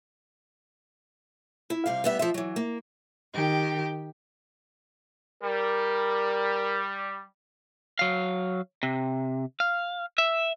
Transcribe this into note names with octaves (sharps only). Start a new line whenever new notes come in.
E4
C3 G3 F5
G3 B3 E5
F3 E5
E3 F#3
A#3
D#3 G4
G3 A#4
F#3 F5
C3
F5
E5